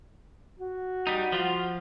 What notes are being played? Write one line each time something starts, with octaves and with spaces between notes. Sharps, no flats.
F#4
G3 D#4
F3 F4